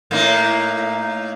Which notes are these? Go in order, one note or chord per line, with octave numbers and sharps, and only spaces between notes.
A2 A#3 D#4